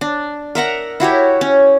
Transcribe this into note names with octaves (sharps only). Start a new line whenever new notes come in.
D4
A#4 E5 F#5 A#5
E4 F#4 G4 C#5
C#4